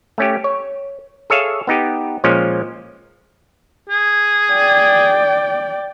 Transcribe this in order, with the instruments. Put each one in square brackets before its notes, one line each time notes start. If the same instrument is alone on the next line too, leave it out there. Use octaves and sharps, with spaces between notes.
[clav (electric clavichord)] A3 C#4 G4
C#5
G#4 A4 C#5 E5 F5
B3 D#4 G4
A#2 F3 G#3 C#4
[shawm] G#4
[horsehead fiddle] D5 G5